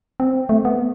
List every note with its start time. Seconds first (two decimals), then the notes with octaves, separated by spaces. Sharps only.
0.20 C4
0.49 A3
0.65 B3